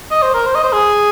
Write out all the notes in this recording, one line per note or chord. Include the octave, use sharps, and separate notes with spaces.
D#5
C5
A#4
C5
D#5
C5
G#4